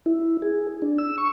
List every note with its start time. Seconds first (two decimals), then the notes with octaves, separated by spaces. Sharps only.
0.06 E4
0.42 G#4
0.82 D4
0.98 E6
1.18 C#6